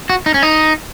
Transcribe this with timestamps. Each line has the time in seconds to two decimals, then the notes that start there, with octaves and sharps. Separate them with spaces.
0.09 F#4
0.26 D#4
0.34 C#4
0.43 D#4